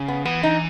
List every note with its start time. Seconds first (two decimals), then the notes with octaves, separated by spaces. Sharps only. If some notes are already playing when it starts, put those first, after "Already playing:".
Already playing: C#3
0.08 B3
0.25 E3 B3
0.43 D#4